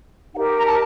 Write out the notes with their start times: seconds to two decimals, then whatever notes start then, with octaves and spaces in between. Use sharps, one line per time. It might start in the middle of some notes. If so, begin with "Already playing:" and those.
0.34 D#4 G4 A#4 F#5
0.57 A#5
0.65 A5